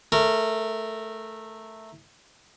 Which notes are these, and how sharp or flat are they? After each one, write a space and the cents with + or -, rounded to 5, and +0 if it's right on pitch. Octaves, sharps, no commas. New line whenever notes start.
A3 -5 A#4 -20